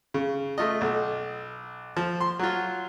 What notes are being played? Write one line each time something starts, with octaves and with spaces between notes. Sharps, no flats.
C#3
A3 F4 D#5
B1
F3
C6
F#3 F4